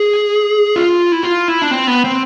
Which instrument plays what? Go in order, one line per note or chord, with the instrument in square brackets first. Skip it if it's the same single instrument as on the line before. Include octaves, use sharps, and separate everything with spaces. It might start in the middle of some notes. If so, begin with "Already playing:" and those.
Already playing: [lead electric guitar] G#4
F4
E4
F4
E4
D4
C4
B3
C4